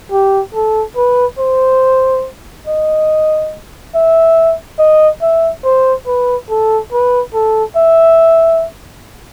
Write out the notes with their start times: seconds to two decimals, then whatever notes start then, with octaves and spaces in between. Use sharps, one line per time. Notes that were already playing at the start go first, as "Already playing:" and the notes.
0.11 G4
0.54 A4
0.96 B4
1.38 C5
2.67 D#5
3.95 E5
4.79 D#5
5.21 E5
5.64 C5
6.06 B4
6.50 A4
6.92 B4
7.34 A4
7.76 E5